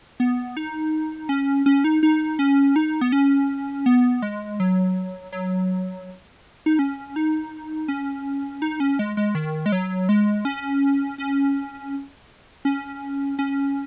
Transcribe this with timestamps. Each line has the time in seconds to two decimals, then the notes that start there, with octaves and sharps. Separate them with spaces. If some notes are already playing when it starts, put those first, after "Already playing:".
0.20 B3
0.57 D#4
1.29 C#4
1.66 C#4
1.84 D#4
2.03 D#4
2.39 C#4
2.76 D#4
3.01 B3
3.12 C#4
3.86 B3
4.22 G#3
4.60 F#3
5.32 F#3
6.66 D#4
6.79 C#4
7.16 D#4
7.88 C#4
8.62 D#4
8.80 C#4
8.99 G#3
9.17 G#3
9.35 D#3
9.66 G#3
9.72 F#3
10.09 G#3
10.45 C#4
11.18 C#4
12.65 C#4
13.39 C#4